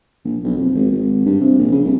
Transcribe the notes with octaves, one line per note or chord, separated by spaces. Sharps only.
A#1
B1
F2
G#1
G#1
G2
C3
A#1
C#3
C2